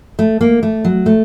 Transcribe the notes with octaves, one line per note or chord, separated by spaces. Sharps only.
A3
A#3
A3
F#3
A3